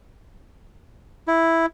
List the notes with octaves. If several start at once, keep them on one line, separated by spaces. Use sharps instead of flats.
E4